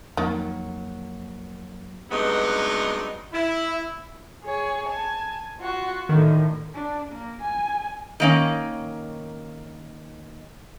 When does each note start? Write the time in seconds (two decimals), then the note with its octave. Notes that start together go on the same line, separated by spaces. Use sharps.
0.17 F2 D#3 F#3 A#3
2.11 G2 C3 F#3 G#3 B3 D#4
3.33 E4
4.43 G#4 C#5 G#5
4.86 G#5 A5
5.60 F4 F#4
6.09 A2 D3 D#3
6.74 D4
7.11 A#3
7.41 G#5
8.20 D#3 A#3 C#4